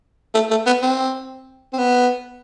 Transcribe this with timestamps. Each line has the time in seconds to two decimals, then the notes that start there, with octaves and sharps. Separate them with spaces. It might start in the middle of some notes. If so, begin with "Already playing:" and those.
0.34 A3
0.50 A3
0.66 B3
0.82 C4
1.73 C4
1.78 B3